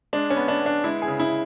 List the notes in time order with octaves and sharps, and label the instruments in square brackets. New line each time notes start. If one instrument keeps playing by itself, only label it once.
[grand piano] G#3 D4
C#4
B3
D4
B3
D4
G#3 E4
G#4
C#3
E4